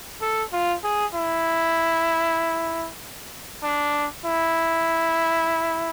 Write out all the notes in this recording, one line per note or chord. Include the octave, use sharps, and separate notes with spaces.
A4
F4
G#4
E4
D4
E4